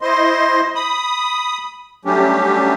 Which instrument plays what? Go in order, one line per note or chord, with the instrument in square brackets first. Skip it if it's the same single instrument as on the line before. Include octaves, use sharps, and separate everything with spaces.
[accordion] E4 C5 D#5 C6
B5 D#6
F#3 G3 A3 C#4 D4 G4